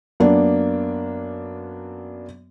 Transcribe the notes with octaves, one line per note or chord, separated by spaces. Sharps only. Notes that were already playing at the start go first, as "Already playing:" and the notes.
F#2 A#3 B3 D4